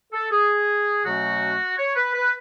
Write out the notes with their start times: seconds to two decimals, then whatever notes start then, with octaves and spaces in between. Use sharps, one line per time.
0.12 A4
0.31 G#4
1.04 B2 F#3 A3 C#4 F#4
1.77 C#5
1.95 B4
2.14 B4